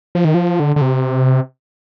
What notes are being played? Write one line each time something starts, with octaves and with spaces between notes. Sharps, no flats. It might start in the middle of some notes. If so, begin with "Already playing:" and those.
F3
D#3
F3
D3
D3
C3